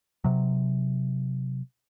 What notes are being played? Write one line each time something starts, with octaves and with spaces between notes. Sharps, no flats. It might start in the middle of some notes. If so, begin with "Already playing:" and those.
C3 F#3